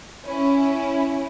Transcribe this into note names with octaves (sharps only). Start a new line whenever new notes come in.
C#4 E4